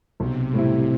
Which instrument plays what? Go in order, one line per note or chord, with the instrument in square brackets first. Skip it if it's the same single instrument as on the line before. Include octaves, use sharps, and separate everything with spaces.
[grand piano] B1 [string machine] C3
[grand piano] A2 G3 C4 E4 [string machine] C3